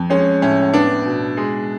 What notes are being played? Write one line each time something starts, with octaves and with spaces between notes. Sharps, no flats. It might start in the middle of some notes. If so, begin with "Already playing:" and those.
Already playing: F2
G#3 C#4
A2 C#4
B3 D4
B2
G#3